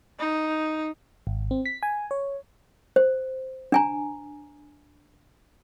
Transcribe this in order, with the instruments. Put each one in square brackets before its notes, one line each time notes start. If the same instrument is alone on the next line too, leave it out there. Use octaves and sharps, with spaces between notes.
[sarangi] D#4
[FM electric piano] G#1
C4
B6
G#5
C#5
[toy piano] C5
D4 G#5 A#5